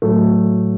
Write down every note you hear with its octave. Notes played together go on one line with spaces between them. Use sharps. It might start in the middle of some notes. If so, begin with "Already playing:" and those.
A2 F#3 A3